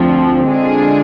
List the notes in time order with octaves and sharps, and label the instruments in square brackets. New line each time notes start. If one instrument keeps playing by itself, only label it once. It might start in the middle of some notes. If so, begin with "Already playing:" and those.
Already playing: [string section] D2 D3 F3 [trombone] C4
[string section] D3 G#3 D4 F4 G#4